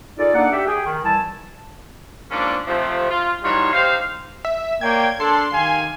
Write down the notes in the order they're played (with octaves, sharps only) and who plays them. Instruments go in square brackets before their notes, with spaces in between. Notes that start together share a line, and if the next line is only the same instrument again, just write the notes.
[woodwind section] D#4 F4 G#4 A4 D5
A#3 D4 D#4 A4 D5 F#5
G4 E5
G#4 G5
D#3
C2 E3 E4 G#5 A5
[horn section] G#2 F3 A#3 C#4 D4
C3 F3 A3
F4
E3 G3 D#4 F4 F#4 C#5
D#4 G4 C5 F5
[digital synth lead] E5
[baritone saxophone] A#3 [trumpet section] C#5 D5 G5 [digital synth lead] G#6
[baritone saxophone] D4 [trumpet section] A4 [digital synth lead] C6
[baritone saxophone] D#3 [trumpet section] G4 F5 G#5